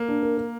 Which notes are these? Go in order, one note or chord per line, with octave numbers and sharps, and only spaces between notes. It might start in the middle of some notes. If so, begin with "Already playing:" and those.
Already playing: A#3
D4
A#4
A#4